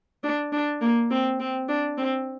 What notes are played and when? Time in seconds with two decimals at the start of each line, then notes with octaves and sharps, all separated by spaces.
0.23 D4
0.52 D4
0.81 A#3
1.11 C4
1.40 C4
1.69 D4
1.98 C4